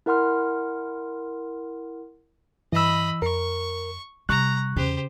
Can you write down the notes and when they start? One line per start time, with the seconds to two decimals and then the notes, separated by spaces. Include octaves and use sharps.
0.06 E4 A#4 F#5 C6 F6
2.72 G2 E3 D#5 B5 E6
3.22 F2 A#4 C#6
4.29 C3 G3 A#5 C#6 F#6
4.77 E2 C#3 G4 C5